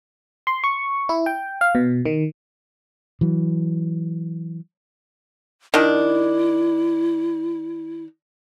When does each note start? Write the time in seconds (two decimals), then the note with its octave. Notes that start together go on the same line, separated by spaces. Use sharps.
0.47 C6
0.64 C#6
1.09 E4
1.26 G5
1.61 F5
1.75 B2
2.06 D#3
3.21 E3 F#3
5.74 D#3 D4 E4